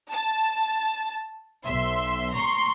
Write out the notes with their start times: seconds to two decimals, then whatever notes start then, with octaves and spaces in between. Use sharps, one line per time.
0.11 A5
1.64 B1 E5 C6
2.34 A#5 C6 C#6